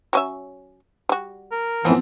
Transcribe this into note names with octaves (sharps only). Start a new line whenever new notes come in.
F#3 C#4 E5
G3 F#4
A#4
F#2 A2 E3 F3 B3 C4